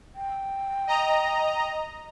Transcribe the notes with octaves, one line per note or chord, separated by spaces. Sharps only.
G5
D#5 A#5